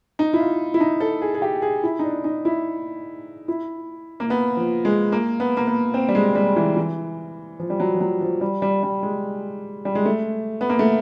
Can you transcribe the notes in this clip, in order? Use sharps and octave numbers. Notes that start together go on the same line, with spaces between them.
D#4
E4
F4
E4
D#4
A4
G#4
G#4
G4
G#4
E4
D#4
D4
D#4
E4
E4
A#3
B3
F3
G#3
A#3
B3
A#3
B3
C4
G3
G#3
G3
E3
E3
F3
G3
F#3
F3
F#3
F3
G3
G3
G3
G#3
G3
G#3
A3
B3
A#3
A3